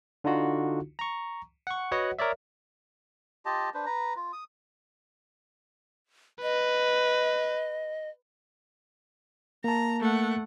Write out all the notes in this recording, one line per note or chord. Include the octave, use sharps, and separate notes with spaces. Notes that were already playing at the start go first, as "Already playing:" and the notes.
D3 D4 D#4 F4 F#4
A#5 C#6
F#5 C#6
F#4 B4 C#5 D#5 F#5
A#4 C#5 D5 E5
F4 G4 D#5 A5
D4 B4 C5
B4 A#5
F4
D#6
B4 D#5
A#3 A5 A#5
A3 F#5